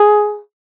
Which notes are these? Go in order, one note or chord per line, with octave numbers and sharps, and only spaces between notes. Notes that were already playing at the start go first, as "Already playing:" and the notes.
Already playing: G#4